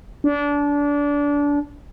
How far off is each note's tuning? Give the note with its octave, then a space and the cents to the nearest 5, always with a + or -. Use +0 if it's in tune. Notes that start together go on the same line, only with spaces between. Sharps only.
D4 -25